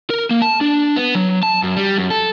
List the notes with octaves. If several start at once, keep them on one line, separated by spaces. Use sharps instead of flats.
A#4
A#3
A5
D4
B3
F#3
A5
F#2
G3
F#2
A4